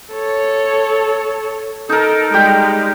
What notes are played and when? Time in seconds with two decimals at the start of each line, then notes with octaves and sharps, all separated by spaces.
0.11 A4 C#5
1.89 D#4 A4 A#4
2.34 G3 G#3 G4